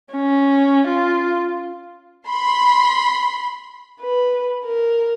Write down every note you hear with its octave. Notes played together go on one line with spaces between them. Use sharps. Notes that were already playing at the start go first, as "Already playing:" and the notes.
C#4
F4
B5 C6
B4
A#4